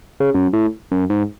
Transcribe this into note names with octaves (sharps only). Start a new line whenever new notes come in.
C#3
F#2
A2
F#2
G#2